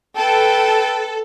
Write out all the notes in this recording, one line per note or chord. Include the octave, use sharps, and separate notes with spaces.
A4 B4 G5